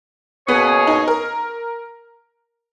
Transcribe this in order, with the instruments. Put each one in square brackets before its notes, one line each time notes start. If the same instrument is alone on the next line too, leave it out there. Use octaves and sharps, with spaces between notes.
[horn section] B2 A#3 C#4 G#4 C#5 [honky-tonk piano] B3
[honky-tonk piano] D#4
A#4